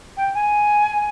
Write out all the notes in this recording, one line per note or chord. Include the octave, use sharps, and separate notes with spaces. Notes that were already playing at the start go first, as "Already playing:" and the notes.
G5
G#5